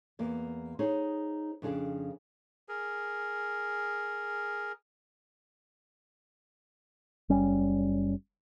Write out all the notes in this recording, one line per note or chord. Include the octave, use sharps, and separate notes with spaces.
E2 A#3 D5
D#4 G#4 C5 C#5
F2 C#3 D4 G#4
G#4 A#4
F#1 G3 C#4